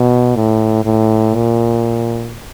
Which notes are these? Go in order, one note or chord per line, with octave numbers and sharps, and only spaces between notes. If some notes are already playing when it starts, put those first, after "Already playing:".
Already playing: B2
A2
A2
A#2